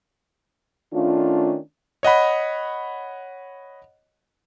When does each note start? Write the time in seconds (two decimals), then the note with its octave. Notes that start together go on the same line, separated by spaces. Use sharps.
0.93 D#3 A3 C#4 D4 F4
2.03 C#5 D#5 F#5 B5